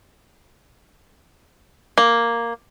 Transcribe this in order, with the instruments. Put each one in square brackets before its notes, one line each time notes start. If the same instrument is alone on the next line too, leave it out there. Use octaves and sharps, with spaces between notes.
[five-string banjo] A#3